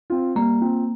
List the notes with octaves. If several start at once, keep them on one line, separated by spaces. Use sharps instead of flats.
C4 F4
G3 A#3
C4 F4